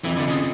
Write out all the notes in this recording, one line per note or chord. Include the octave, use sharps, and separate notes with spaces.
F2 E3
D3
C#3